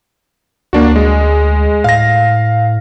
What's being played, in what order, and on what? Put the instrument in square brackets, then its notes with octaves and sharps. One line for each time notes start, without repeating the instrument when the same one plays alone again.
[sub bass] D2 [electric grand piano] A#3 D4 F#4
[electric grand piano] G#3
[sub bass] A2 [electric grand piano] F5 A#6